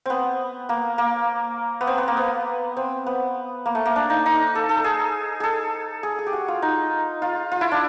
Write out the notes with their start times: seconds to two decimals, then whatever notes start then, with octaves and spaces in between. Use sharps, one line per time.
0.06 B3 C4
0.69 A#3
0.98 A#3
1.81 B3
1.87 C4
1.98 B3
2.08 A#3
2.17 B3
2.77 C4
3.06 B3
3.66 A#3
3.75 A3
3.86 A#3
3.96 D4
4.10 D#4
4.26 D#4
4.55 A4
4.69 A4
4.84 G#4
5.40 G#4 A4
6.03 G#4
6.19 G#4
6.27 G4
6.33 F#4
6.48 F4
6.62 D#4
7.22 F4
7.52 F4
7.61 E4
7.72 D4